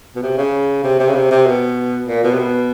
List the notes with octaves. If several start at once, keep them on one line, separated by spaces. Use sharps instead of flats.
B2
C3
C#3
C3
C3
C#3
C3
C3
B2
A#2
B2
C3
B2